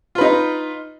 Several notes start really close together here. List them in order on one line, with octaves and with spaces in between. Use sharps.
F4 B4 D#4